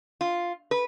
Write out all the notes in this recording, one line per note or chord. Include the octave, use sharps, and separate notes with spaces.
F4
B4